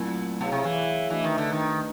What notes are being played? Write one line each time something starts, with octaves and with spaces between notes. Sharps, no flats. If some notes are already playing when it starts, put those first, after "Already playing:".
Already playing: A#2 F#3 A3 C4 E4
B2 E4 G#4 C#5 F5
C3
E3
E3 A3 D4 F#4 B4 D#5
D#3
D3
D#3